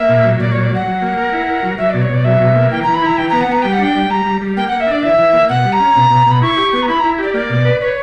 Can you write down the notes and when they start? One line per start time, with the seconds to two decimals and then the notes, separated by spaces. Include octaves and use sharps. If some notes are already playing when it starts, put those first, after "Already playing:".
Already playing: A#3 E5
0.09 A#2
0.24 F#3
0.39 A#2 D5
0.52 F#3 C#5
0.63 D5
0.71 F#3 F#5
0.86 F#3
1.02 A#3
1.17 A#4
1.32 E4
1.47 A#4
1.63 F#3
1.78 F#3 E5
1.90 B2 D5
2.02 C#5
2.09 B2 D5
2.24 F#3 E5
2.40 B2
2.55 A#3
2.71 E3 G5
2.83 E3 A#5
2.94 B5
3.02 E4 A#5
3.17 E3 G5
3.29 B3 A#5
3.41 F#5
3.49 B3 A#5
3.62 G3 G5
3.73 F#5
3.79 D4 G5
3.95 G3
4.10 G3 A#5
4.25 G3
4.42 G3
4.57 A#3 G5
4.68 A#3 F#5
4.80 E5
4.87 D4 D5
5.03 E3 E5
5.18 E3
5.33 A#3
5.49 B2 F#5
5.64 G3
5.72 A#5
5.80 C#4
5.96 B2
6.10 B2
6.26 B2 B5
6.42 E4 C#6
6.57 G4
6.73 B3
6.82 A#5
6.88 E4 B5
7.00 E4 A#5
7.18 G4 D5
7.34 A#3 D5
7.50 B2
7.65 B4
7.81 B4 C#5